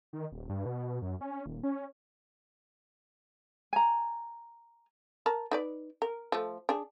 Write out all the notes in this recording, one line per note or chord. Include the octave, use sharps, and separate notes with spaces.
D#3
D#1
G2
B2
F#2
C#4
D#1
C#4
G#5 A#5
A#4 A5 A#5
D#4 B4 D5
A#4
F3 A3
D4 G#4